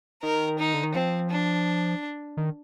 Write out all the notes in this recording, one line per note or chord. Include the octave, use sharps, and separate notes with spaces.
D#3 A#4
D#4
D3
D#3
F3 C4
D4
D#3